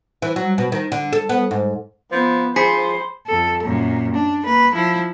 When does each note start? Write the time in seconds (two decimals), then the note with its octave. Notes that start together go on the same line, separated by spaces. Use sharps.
0.22 E3
0.36 F#3
0.58 B2
0.72 D#3
0.92 D3
1.13 A4
1.29 B3
1.51 G#2
2.11 F3 B3
2.56 F3 G#4 C5 B5 B6 C#7
3.27 F2 A4
3.62 F#2 A#2
4.14 D4
4.45 A#3 B4
4.74 F3 E4